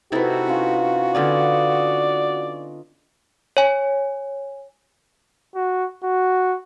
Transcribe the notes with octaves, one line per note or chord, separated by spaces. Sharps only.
C3 D#4 E4 F#4 A4 B4
C#4 F4
D3 B3 C#4 F4 D5 D#5
C#5 G#5
F#4
F#4